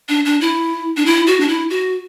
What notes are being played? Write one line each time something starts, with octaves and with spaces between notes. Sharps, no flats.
D4
D4
E4
D4
E4
F#4
D4
E4
F#4